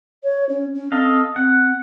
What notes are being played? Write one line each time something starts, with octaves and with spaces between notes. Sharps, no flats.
C#5
C#4
C#4
C4 A4 D#5 F5
C4 F#5